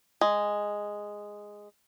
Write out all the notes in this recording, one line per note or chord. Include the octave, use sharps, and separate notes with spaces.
G#3